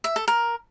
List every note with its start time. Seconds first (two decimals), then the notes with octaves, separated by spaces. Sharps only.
0.04 E5
0.16 A4
0.28 A#4